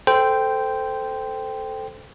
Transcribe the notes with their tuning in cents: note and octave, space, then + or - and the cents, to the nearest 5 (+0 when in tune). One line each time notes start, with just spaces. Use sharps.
A4 +0 C5 -15 G5 +0